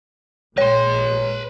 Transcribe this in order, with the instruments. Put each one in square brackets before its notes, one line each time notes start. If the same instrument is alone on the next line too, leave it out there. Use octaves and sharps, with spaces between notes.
[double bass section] A#2 G#3 [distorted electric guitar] B4 C6 [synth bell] C#5